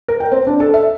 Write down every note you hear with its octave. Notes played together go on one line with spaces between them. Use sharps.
A#4
G5
C4
D4
A4
E5